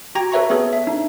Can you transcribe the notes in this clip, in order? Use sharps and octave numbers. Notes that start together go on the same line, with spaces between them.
F#4 G4 G5 A#5 G#6 A#6
A4 B4 C#5 E5 A#5 C#6
B3 G#4 A4 C#5
E5
D4 D#4